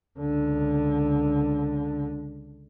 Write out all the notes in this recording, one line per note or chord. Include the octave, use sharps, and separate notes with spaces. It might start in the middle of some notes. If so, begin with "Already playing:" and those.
C#2 D3